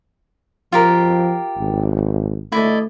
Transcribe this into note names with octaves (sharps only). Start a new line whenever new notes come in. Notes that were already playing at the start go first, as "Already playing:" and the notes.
F3 F4 G4 A#4
G#1
A3 E4 D5 D#5